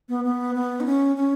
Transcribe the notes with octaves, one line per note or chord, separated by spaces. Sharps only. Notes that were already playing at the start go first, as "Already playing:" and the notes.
B3
B3
B3
D#4
C#4
C#4